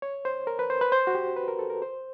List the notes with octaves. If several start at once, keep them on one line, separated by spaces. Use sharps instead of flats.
C#5
C5
A#4
B4
C5
B4
C5
F#4
G4
B4
A#4
A4
A#4
C5